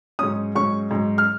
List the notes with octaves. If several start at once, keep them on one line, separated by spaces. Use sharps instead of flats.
G#2 F#3 C#4 D#6
G#2 F#3 C#4 C#6
G#2 F#3 C#4
F6